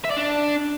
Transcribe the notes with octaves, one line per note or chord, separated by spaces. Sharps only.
E5
D5
D4